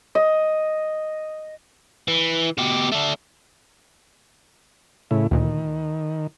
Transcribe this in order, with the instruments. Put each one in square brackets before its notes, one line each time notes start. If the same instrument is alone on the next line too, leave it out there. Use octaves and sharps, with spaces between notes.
[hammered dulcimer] D#5
[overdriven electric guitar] E3
B2 G4
A3 D4
[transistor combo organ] A2 C#3 E4
[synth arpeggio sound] D2 A#2 [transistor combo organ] D#3